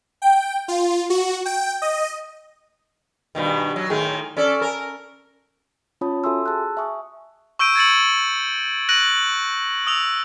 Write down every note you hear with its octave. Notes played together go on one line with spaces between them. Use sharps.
G5
F4
F#4
G5
D#5
G2 B2 D#3
F#3
A2 D#3 G#4
C#4 A4 D5
A#4
C#4 F4 C#5 A5 B5 D#6
F#4 A4 E5 G#5 C6 E6
G#4 A5 E6 F#6
E5 G#5 C#6 D#6
C#6 E6 G6 D7 D#7
G#6 A6 C#7 F#7
F#6 A#6 D7 D#7 F#7
D#6 E6 F7